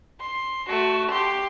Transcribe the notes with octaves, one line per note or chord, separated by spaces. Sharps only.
C6
A3 F#4
G4 C6